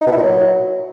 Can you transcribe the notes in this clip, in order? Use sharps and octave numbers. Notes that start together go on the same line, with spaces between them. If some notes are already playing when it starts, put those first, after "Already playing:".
D#4
B2
E4
A#2
F#3